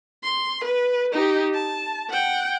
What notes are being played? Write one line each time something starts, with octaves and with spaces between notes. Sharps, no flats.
C6
B4
D#4 G4
A5
F#5 G5